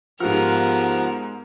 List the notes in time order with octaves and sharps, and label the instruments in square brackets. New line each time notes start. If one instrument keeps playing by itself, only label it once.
[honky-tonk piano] G#2 F6 [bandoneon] F3 F#5 [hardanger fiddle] B3 A#4 [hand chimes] F4 G4